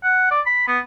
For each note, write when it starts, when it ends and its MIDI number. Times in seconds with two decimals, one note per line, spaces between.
0.03 0.26 78
0.31 0.40 74
0.46 0.66 83
0.67 0.79 59